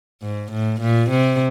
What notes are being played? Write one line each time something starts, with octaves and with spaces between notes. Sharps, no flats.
G#2
A2
A#2
C3